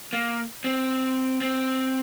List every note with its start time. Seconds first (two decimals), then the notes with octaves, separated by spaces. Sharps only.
0.13 A#3
0.64 C4
1.41 C4